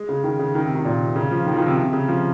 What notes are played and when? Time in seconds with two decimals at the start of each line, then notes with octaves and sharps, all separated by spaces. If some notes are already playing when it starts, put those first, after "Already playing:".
Already playing: G#3
0.09 C#3
0.24 D#3
0.39 C#3
0.55 D#3
0.65 C3
0.75 D#3
0.85 A#2
1.01 C3
1.16 C#3
1.31 F3
1.46 D#3
1.53 F3
1.57 D#3
1.67 C3
1.77 C3
1.93 C#3
2.08 F3